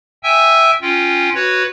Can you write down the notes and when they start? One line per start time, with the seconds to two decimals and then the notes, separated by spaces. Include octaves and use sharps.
0.23 E5 G5 G#5 E6
0.81 C#4 F4 G5
1.34 F#4 B4 C#5